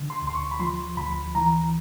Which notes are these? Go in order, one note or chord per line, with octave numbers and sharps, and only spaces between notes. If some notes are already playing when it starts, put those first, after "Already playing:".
Already playing: D3
C6
D2
C6
C#6
B5
F3 C6
D2 B5
E3 A#5